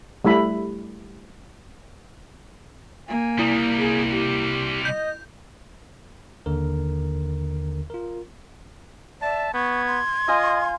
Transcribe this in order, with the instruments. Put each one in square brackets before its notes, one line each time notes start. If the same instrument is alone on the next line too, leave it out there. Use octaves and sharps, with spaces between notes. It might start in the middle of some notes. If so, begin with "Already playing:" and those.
[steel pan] G3 A3 E4 B5
[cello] A#3 [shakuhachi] G#5
[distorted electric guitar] C3 G3 [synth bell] E4
[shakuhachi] G#4
G4
[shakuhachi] D#5 [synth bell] G6
[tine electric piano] D#2 D3 A#4
F4 A#4
[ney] D5 [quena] E5 [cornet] A5
[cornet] B3 [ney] C#6 [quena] G#6
[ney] C6
[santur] F4 F5 G#5 [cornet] D#5